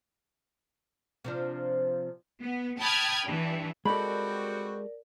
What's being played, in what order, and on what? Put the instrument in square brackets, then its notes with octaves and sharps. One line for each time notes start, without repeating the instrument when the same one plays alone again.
[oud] C3 F3 D4
[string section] B3
G5 A5 B5 D#6 F6 G#6
G2 E3
[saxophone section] G3 C4 F#4 [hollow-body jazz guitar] G#3 A4 [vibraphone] A#4 D5 [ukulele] B5